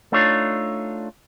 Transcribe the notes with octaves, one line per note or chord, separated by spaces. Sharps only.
A3 D4 D#4 F4 C#5